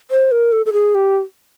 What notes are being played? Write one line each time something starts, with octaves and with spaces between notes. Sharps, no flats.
C5
A#4
A4
A4
G#4
G4